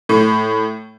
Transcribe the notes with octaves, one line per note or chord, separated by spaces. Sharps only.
A2